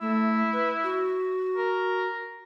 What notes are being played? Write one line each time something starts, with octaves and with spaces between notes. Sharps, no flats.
A3 E4
B4
F#4
A#4